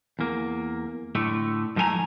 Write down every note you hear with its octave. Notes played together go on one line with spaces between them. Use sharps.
E2 A#3
A2 D3 A3
G#2 F3 A3 E4 G#5 A#5